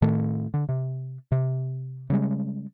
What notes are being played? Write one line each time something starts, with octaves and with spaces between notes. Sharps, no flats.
A2 D#3 A3
D3
C3
C3
C#3 G3 G#3